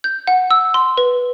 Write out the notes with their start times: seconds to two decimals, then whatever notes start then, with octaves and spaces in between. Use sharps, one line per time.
0.04 G6
0.27 F#5
0.51 E6
0.74 C6
0.97 B4